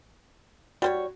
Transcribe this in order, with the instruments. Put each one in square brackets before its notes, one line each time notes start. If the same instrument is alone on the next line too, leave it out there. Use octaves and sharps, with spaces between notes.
[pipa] G3 C5 C#5 [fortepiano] F#4